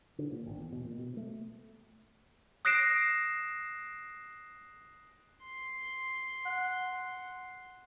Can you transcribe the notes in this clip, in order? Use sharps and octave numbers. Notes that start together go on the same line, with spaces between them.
D3
A#2
G#1
E2
B2
A#2
B2
A3
D#6 F#6 A#6 C7 D7 E7
C6
F#5